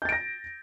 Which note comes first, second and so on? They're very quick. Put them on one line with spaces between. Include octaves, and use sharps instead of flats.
G6 A6 D7 A#6